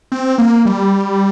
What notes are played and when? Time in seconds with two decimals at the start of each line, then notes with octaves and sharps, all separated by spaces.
0.12 C4
0.38 A#3
0.65 G3